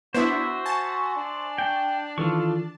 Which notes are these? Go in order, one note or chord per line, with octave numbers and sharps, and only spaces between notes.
B3 D4 E4 F#4 C5 E5
G#5 A5 C#6
D4
G5
D#3 E3 F4 A4 C#6